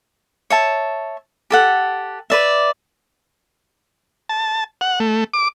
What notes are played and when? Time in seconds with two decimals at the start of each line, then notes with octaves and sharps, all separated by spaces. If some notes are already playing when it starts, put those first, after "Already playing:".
0.50 C#5 E5 A5
1.50 G4 A4 F#5
2.30 B4 D5 E5
4.29 A5
4.81 F#5
5.00 A3
5.34 D6